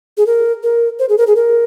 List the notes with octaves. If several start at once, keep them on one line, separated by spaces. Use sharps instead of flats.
G#4
A#4
A#4
C5
G#4
A#4
G#4
A#4